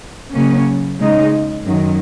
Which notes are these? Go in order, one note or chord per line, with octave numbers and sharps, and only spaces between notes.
C#3 F#3 A#3 C#4
C#3 G#3 D#4
F#2 D#3 F#3